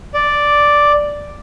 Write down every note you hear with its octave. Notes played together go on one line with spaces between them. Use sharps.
D5